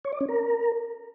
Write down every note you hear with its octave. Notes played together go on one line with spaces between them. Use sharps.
C#5
D5
C#4
A#4